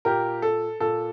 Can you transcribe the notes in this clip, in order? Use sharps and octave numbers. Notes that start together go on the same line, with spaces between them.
A#2 G4 A#4
A4
A#2 A4